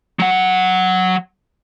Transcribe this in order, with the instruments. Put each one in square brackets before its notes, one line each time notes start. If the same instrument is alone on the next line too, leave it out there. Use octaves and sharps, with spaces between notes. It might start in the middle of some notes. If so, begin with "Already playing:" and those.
[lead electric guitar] F#3 F#5